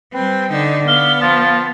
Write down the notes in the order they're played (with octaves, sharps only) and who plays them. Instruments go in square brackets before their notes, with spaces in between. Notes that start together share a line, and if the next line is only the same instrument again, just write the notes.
[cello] G3 C4 [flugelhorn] B4 [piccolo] G5
[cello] D3 D#4 [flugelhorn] D5
[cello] B3 [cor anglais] F5 [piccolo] G7
[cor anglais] F3 [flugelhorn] F5 [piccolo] A6